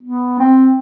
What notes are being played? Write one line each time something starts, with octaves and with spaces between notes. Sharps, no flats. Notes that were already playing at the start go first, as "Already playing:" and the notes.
B3
C4